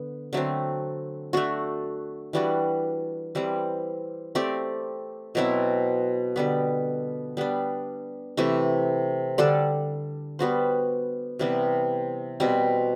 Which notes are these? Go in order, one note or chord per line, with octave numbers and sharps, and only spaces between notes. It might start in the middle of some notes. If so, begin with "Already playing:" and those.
Already playing: D3 B3
D3 F#3 A3 C4
A3 D4 F#4
E3 G3 D4 F#4
E3 G3 C4
A3 C4 G4 D5
B2 F#3 C4 E4
D3 G3 B3
G3 B3 D4
C3 E3 A3
D3 G3 D4 A4
G3 B3 F#4 C5
C3 E3 G3 B3
B2 G3 C4